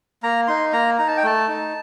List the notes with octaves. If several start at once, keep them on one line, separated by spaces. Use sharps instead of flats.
A#3 A#5
D#4 C6
A#3 A#5
D#4 A#5
A5
G5
A3 A5
D#4